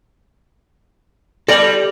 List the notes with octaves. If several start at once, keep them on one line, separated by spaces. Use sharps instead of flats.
G3 A4 D5 A#6 F#7